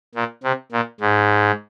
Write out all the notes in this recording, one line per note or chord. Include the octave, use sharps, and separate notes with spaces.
A#2
C3
A#2
G#2